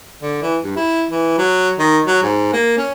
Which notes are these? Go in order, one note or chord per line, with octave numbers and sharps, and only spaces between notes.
D3
E3
G2
E4
E3
F#3
D#3
F#3
G#2
A#3
C#4